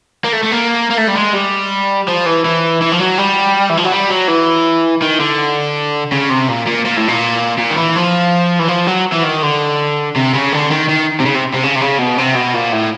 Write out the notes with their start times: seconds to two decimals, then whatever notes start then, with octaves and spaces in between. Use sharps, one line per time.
0.24 A#3
0.33 A3
0.43 A3
0.51 A#3
0.91 A#3
0.98 A3
1.08 G3
1.16 G#3
1.34 G3
2.08 F3
2.26 E3
2.45 E3
2.81 E3
2.92 F3
2.99 F#3
3.18 G3
3.69 E3
3.77 F3
3.84 F#3
3.92 G3
4.10 F#3
4.28 E3
5.02 D#3
5.20 D3
6.12 C#3
6.30 C3
6.49 A#2
6.67 A#2
6.85 A#2
6.97 A2
7.08 A#2
7.58 A#2
7.71 D#3
7.76 E3
7.96 F3
8.60 E3
8.68 F3
8.87 F#3
9.12 E3
9.23 D#3
9.42 D3
10.16 C3
10.34 C#3
10.52 D3
10.71 D#3
10.89 D#3
11.20 C3
11.25 C#3
11.34 C3
11.53 C3
11.63 C#3
11.76 C3
11.81 C#3
11.99 B2
12.18 C3
12.36 B2
12.54 A#2
12.72 A2